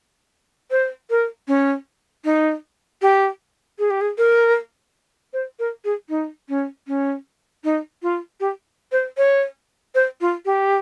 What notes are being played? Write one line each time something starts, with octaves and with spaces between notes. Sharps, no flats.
C5
A#4
C#4
D#4
G4
G#4
G4
G#4
A#4
C5
A#4
G#4
D#4
C#4
C#4
D#4
F4
G4
C5
C#5
C5
F4
G4